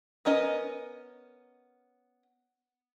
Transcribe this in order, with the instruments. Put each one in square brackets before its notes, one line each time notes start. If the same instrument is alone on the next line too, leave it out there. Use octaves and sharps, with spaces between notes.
[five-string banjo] B3 C#4 A#4 D#5 G#5